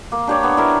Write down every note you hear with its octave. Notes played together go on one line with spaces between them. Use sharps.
A#3
D4 G4 C#5
B3
E4 A#4